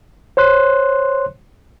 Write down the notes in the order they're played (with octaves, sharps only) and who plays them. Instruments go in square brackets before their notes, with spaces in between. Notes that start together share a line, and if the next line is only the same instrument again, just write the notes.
[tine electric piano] C5 C#5 C6 F#6